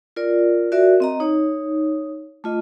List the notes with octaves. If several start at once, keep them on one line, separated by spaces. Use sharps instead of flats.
F4 A#4 D5
F#4 A#4 D5 E5
C4 D#5 A#5
D#4 C#5
A3 F4 D#5